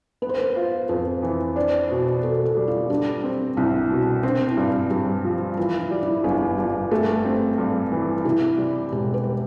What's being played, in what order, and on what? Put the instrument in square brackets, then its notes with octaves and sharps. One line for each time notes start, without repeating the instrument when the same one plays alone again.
[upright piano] B3 [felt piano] B4
[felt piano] C5
B4
[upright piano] F4
[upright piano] F2 [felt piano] B4
[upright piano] E3
[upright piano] D4 [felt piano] C5
[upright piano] B2
[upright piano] B2 [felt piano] A4
[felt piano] A4
[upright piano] G3
[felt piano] F4
[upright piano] G3 [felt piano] D4
[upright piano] C4
[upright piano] C2 [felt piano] E4
[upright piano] B2
[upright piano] C4 [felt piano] D4
[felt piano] E4
[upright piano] G2
[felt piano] G4
[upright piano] G2 [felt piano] G4
[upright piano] F3
[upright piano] E3 [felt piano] F4
[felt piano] E4
[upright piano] G3
[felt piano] E4
[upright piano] G1 [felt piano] D4
[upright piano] G2 [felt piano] F4
[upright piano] A3 [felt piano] G4
[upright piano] C4
G2
E3
[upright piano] C3 [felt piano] E4
[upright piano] G3
[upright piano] E1 [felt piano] G4
[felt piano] B4